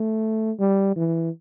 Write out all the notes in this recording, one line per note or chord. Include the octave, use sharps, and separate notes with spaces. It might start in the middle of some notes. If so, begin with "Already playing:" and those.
Already playing: A3
G3
E3